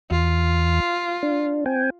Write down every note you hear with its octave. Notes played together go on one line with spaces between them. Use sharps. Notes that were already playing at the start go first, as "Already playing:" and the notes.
E2 F4
D4
C4 G5 G#5